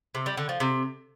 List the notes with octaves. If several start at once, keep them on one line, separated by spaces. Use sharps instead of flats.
C3
G3
D3
F3
C3